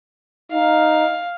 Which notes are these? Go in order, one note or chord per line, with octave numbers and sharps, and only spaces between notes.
D#4 F5